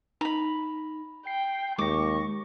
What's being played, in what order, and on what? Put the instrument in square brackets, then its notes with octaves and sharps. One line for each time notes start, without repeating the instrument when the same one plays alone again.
[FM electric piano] D#4 [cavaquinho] A#5 B5
[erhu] G5 [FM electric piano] C7
[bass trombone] D#2 [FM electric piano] G#3 A#6 [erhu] C#6 [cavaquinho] D6